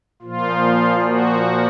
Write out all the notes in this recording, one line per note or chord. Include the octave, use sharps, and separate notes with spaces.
A#2 F3 F4
F#4